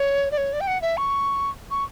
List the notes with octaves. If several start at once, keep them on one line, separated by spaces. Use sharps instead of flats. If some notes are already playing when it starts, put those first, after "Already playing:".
Already playing: C#5
D5
C#5
D5
G5
F#5
E5
C#6
C#6